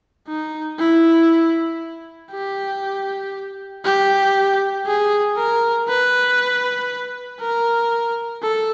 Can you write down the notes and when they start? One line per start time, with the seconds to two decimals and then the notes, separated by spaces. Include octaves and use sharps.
0.28 D#4
0.79 E4
2.32 G4
3.85 G4
4.86 G#4
5.37 A#4
5.88 B4
7.40 A#4
8.42 A4